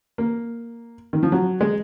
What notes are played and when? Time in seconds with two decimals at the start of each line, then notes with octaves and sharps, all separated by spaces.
0.18 A#3
1.13 D#3
1.23 F3
1.32 F#3
1.61 G#3